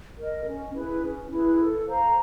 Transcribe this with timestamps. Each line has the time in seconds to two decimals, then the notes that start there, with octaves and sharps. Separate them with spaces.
0.18 A#4 D#5
0.45 C#4
0.73 E4 G#4 B4
1.03 C#4
1.30 E4 G#4 B4
1.58 A4
1.87 C5 F5 A#5